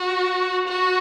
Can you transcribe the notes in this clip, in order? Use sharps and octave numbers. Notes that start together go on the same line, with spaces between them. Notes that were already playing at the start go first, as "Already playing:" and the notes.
Already playing: F#4
F#4